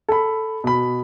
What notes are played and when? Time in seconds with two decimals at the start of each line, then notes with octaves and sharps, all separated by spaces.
0.09 A4 B5
0.64 B2 B5